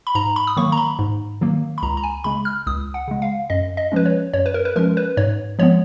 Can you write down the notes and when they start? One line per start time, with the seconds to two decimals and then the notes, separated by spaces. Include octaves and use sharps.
0.07 B5
0.15 G#2 A#5
0.36 B5
0.47 D#6
0.57 D#3 F#3 A#3 C#6
0.72 A#5
0.78 B5
0.99 G#2
1.41 D#3 F#3 A#3
1.78 B5
1.82 C#2 A#5
1.97 A#5
2.03 G#5
2.24 C#3 G#3 B5
2.45 F6
2.67 C#2 D#6
2.94 F#5
3.08 C#3 G#3
3.22 F5
3.50 F#2 D#5
3.77 D#5
3.92 F3 G#3 C#4 B4
4.06 C#5
4.33 F#2 C#5
4.46 B4
4.54 A#4
4.65 B4
4.76 F3 G#3 C#4 A#4
4.97 B4
5.17 G#2 C#5
5.59 F3 G#3 B3 C#5